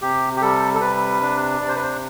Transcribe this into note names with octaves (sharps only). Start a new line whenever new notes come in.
C3 G4
G4
G3 A4
A4
C3 B4
D4
C3 D5
C5
B4
C5